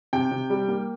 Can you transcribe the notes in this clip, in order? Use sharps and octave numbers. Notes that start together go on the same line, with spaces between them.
C3 G5
C3
G3
A#3